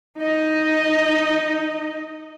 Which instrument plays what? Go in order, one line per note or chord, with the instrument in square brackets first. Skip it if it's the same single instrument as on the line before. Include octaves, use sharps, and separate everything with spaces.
[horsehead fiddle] D#4 D#5